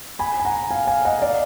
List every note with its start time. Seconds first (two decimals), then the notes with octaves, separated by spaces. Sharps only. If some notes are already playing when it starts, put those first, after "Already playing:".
0.19 G#5 B5
0.40 G#5
0.45 F#5 A#5
0.71 F5 G#5
0.87 F5 G#5
1.05 D#5 F#5
1.22 D5 F5